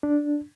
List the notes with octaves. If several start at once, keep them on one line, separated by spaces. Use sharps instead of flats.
D4